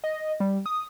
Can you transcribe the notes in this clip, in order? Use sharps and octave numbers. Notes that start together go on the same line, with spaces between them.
D#5
G3
D#6